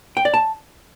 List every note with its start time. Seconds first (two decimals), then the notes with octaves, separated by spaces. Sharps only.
0.17 G5
0.25 D5
0.34 A5